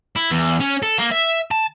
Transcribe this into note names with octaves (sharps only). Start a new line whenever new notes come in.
E4
E2
C#4
A4
A#3
E5
A5